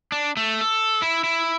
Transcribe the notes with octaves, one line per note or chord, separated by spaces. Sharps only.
D4
A3
A4
E4
E4